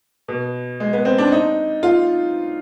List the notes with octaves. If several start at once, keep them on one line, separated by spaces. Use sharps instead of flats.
B2
G#3
B3
C4
D4
D#4
F4